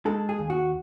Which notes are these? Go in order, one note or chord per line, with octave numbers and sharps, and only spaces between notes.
G#3 A4
G#4
D#2
F#4